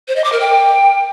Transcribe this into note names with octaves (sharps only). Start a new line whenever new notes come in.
C5
D#5
D6
A#4
G5